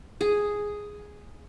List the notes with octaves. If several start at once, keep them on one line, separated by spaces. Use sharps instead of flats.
G#4